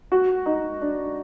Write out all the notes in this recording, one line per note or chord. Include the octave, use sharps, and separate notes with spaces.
F#4
D#4
D4